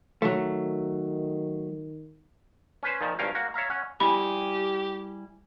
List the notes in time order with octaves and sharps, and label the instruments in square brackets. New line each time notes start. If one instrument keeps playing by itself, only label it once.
[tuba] D#3 [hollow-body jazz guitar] F#3 A3
[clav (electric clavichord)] C#4 B4 C5
A#2 D#3 F3
G#1 G2 C#4 A#4 F5 G5
A#3 F#4
C#5 E5 F5 A#5
C#4 C#5 F#5
[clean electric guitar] G3 E4 G#4 [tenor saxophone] G4 [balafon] B5